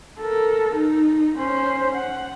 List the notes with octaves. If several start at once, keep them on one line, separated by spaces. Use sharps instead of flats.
A4 A#4
D#4
C#4 C5
F#5